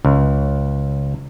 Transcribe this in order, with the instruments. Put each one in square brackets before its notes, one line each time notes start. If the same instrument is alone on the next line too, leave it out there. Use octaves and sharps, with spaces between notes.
[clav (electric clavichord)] C#2